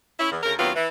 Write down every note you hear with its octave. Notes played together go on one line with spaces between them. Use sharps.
C#4 E4
E2
D2 C#3 A#4
D#2 F#3 B3 C4 F4
E3